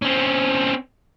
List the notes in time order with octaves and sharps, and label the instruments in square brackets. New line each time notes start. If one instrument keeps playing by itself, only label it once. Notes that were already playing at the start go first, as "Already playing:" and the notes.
[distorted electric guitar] C4 C#4